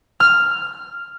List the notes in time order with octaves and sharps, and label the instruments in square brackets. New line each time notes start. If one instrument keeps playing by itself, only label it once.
[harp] F6